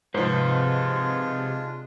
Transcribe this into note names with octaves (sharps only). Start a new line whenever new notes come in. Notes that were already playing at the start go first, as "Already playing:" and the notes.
G#2 C3 F3 G#3 D4 F4 B4 C5